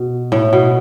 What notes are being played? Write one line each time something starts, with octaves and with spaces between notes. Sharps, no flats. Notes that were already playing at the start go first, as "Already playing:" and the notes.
Already playing: B2
A2
B2